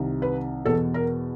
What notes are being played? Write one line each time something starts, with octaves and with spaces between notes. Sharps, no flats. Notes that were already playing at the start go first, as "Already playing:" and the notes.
Already playing: C2 C3 D#3
B4
E2 B2 A4
A#4